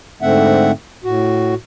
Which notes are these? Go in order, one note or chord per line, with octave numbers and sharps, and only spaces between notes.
G#2 D3 A3 C4 E5 F#5
A2 F#4